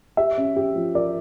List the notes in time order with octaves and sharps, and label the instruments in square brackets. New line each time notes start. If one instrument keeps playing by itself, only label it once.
[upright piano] G4 [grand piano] E5
[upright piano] C#4
G4
F3
[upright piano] A#4 [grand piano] D5